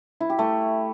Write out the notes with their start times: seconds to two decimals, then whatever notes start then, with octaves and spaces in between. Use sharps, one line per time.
0.20 E4
0.30 G4
0.39 A3